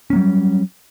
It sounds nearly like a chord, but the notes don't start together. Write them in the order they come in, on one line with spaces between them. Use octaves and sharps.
C#4 A#3 F#3 G3